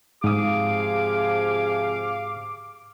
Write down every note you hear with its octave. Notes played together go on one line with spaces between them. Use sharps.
G#2 C3 F3 G#4 F5 D6 D#6